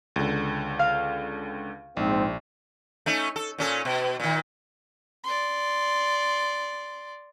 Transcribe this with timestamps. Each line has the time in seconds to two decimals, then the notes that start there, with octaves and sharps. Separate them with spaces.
0.16 C#2 D3
0.79 F5
1.97 A#1 G#2 C4
3.06 A3 C#4 D#4
3.36 A4
3.58 A#2 C#4 A4
3.85 B2
4.20 A#2 D#3
5.24 D5 C6